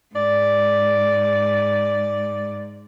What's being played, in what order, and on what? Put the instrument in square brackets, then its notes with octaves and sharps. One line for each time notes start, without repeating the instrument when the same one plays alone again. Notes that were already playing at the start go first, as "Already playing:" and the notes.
[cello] G#2 [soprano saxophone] D5